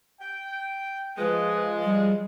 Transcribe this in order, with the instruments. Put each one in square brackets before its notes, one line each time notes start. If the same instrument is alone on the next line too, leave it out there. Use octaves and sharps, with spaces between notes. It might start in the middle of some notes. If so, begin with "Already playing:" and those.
[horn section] G5
[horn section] F3 G#3 [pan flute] B4
[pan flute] G3